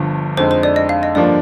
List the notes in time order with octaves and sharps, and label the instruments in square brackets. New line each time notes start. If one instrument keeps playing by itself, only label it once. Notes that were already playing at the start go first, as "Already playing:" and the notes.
Already playing: [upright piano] G1 G2 F3
[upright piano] F2 D3 G#3 D#4 [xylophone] C5
[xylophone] C5
D5
D#5
F5
D#5
[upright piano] G2 D3 F3 A#3 D4 [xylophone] D5